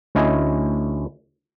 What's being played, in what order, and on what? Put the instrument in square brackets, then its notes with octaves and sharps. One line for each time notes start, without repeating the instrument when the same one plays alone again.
[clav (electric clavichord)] D2 C#4 E4 D#5 G#5